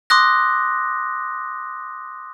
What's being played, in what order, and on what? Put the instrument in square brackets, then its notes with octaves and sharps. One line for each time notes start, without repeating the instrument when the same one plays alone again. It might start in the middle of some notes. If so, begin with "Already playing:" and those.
[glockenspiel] C6 D6 D#6 F#6 A#6